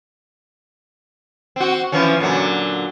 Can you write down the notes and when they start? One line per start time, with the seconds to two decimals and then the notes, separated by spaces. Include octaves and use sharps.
1.56 C4 F#4
1.92 E3 F3 C#4
2.20 A#2 D3 F#3